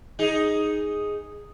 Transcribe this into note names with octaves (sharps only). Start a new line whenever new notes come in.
D#4 G#4